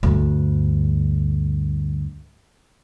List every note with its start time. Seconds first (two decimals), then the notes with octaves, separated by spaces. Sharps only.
0.03 D2 G2